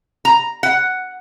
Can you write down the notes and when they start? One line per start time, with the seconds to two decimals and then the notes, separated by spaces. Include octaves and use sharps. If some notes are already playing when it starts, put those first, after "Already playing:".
0.25 A#5
0.63 F#5